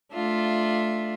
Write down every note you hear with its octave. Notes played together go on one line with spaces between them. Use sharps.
A3 D4 F4 E5